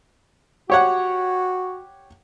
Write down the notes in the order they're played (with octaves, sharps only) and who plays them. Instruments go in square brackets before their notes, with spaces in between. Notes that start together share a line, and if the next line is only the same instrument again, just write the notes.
[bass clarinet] F#4 [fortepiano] G4 C#5 F#5